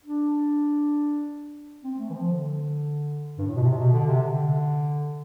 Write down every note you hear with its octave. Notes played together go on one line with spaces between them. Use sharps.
D4
C4
A3
E3
F3
D3
G2
A2
B2
C3
B2
D3
C3
D3